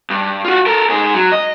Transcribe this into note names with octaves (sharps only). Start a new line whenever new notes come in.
G2
F4 F#4
A4 A#4
G#2 G#4
F#3
D#5